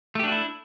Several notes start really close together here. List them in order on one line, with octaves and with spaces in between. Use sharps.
A3 G4 D4 F#4 E4